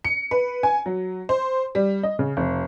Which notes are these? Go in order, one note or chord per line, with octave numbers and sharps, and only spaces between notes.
C#7
B4
G#5
F#3
C5
G3
D#5
C#3
F1